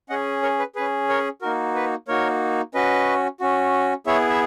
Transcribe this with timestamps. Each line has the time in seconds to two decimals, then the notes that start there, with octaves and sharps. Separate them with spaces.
0.10 C#4 G#4 D#5 F#5
0.43 A#4 C#5
0.59 B4
0.75 C#4 G#4 B4
1.09 A#4 C#5
1.42 A#3 D#4 F#4 A#4
1.75 B4
2.08 A#3 D#4 F#4 A#4 C#5
2.74 C#4 F#4 B4 D#5
3.40 C#4 F#4
4.07 B3 E4 G#4 C#5 E5
4.29 E5